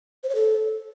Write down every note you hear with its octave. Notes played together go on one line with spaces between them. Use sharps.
C5
C#5
A4